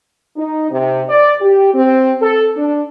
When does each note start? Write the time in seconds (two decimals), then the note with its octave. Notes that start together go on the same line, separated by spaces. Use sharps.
0.37 D#4
0.71 C3
1.08 D5
1.40 G4
1.74 C4
2.22 A4
2.56 D4